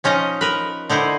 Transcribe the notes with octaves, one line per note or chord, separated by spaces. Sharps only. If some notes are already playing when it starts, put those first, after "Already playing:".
F3 C#4 D#4 D#5
A#4 B4
D3 D#4 E4 C5